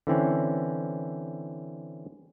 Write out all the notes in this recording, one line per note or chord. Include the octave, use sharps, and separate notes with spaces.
D3 E3 C4 C#4